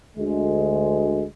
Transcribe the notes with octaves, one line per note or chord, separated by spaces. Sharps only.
D2 G#3